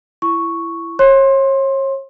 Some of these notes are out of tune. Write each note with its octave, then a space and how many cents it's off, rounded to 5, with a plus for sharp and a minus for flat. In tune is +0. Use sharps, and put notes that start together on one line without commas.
E4 +20 C#6 +0
C#5 -35 C6 +15